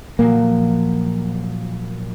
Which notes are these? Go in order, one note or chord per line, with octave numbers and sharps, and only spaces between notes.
A#2 F3 F#3 A#3